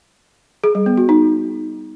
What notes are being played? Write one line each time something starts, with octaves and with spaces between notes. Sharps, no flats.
G#4
G3
B3
F#4
D#4